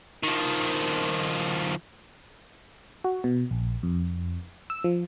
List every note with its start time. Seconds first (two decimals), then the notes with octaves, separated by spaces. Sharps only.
0.23 D#3 F3
3.04 F#4
3.24 B2
3.51 A#1
3.83 F2
4.70 E6
4.84 F3